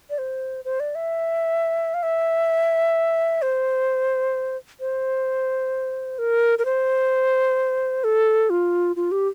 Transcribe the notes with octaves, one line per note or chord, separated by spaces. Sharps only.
D5
C5
C5
D5
E5
F5
E5
C5
C5
A#4
A#4
C5
A4
F4
F4
G4